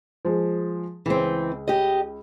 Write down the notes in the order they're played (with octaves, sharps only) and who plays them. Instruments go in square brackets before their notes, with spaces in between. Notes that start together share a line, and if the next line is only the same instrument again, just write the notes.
[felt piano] F3 G#3
[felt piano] C#2 [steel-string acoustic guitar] E3 C4
[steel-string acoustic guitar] G4 D#5